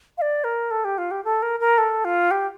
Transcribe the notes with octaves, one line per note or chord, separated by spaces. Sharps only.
F5
D5
A#4
A4
G4
F4
G4
A4
A#4
A#4
A4
F4
G4